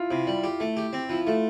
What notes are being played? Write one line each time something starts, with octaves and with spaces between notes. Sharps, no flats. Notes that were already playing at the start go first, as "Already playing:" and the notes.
Already playing: E4 F4
C3 E4
G3
G4
A3
G4
C4
F3 E4
A3 F4